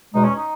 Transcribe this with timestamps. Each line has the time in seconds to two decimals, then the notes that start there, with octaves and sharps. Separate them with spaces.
0.14 E2 B2 G#3 D#4
0.24 C#4
0.36 D#4